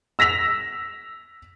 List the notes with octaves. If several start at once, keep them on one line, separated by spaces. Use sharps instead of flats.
E6 A#6 B6 F7